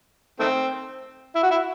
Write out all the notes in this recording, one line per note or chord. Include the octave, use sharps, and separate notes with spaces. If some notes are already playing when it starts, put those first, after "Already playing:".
D#3 A3 C4
E4
F#4
E4